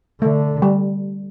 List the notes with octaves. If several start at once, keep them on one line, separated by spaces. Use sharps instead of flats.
D3 A3
G3